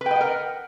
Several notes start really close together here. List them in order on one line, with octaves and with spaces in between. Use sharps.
B4 G5 D#5 F#5 A#4